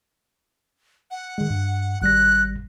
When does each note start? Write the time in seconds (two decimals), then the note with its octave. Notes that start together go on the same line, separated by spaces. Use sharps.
1.11 F#5
1.38 D#3 G#3
1.50 G2
2.02 G#1 G3 F#6 A#6